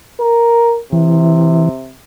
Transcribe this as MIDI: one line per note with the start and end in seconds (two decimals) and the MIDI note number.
0.20 0.80 70
0.92 1.95 48
0.92 1.69 52